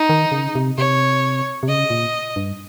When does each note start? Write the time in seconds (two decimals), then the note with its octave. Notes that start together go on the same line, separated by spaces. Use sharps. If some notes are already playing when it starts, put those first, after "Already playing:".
Already playing: D#4
0.09 D#3
0.31 C#3
0.55 C3
0.78 C3 C#5
1.63 C3
1.68 C#3 D#5
1.90 A#2
2.36 G2